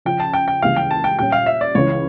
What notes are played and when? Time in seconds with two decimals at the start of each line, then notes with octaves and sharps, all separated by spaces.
0.05 C#3 F3 C#4 F4 G5
0.20 A5
0.34 G5
0.48 G5
0.62 C#2 C#3 E3 G3 A#3 F5
0.76 G5
0.91 A5
1.04 G5
1.18 A#2 G3 C#4 G5
1.32 F5
1.46 E5
1.61 D5
1.75 C#2 C#3 E3 C#5